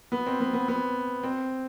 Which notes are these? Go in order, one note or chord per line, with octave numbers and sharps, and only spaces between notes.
B3
C4
B3
B3
B3
C4